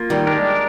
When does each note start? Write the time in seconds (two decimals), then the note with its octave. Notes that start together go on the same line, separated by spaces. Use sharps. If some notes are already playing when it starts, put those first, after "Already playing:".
Already playing: A#3 F4
0.10 D#3 G3
0.27 G#3 D4 G4 A#4